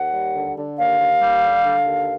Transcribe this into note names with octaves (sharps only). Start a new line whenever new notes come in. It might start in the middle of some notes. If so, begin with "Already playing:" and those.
Already playing: D#2 F#5
G3
D3
D3
D#2 F5
D#2
G3
D3
D3
D#2